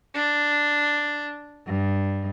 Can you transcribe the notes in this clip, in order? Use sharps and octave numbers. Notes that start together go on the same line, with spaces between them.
D4
G2